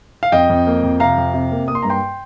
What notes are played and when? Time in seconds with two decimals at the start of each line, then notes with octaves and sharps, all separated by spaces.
0.23 F5
0.32 F2 D#5 G5
0.50 F2
0.67 A#3
0.83 F2
1.00 C3 F5 A#5
1.17 F2
1.34 C3
1.51 A#3
1.68 A#3 D#6
1.75 C6
1.82 G2 A#5
1.90 G5 C6